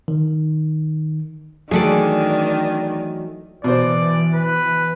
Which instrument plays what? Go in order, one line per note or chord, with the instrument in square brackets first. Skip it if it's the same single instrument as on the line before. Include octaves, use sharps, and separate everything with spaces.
[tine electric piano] D#3
[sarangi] D#3 [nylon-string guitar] E3 F#3 A3 [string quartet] D4 [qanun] G#4 A4 D5
[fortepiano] B2 C5 [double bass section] E3 [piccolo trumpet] D5
[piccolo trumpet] B4